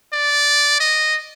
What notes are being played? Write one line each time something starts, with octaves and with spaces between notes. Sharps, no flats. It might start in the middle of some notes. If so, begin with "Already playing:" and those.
D5
D#5